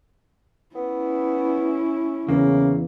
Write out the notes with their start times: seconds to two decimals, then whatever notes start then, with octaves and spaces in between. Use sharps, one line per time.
0.75 B3 C#4 E4
2.29 E2 C#3 A#3